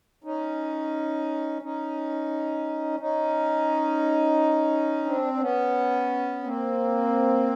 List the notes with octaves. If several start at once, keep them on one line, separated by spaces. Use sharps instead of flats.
C#4 D#4
C#4 D#4
C#4 D#4
C4 D4
D4
B3 C#4
A#3 C4